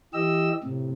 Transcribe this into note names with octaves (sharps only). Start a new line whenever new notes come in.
E3 G4 D#5 E6
A2 C3